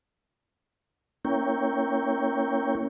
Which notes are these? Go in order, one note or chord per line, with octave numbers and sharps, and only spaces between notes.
A#3 C#4 E4 A#4 C#5 G5